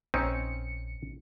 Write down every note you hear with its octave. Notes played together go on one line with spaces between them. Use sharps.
A#1 C4 C#4 D#4 C#7